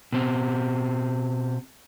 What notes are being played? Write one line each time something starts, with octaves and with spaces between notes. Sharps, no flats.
B2 C4